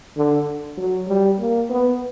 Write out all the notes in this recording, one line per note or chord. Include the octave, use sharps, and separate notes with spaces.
D3
F#3
G3
A#3
B3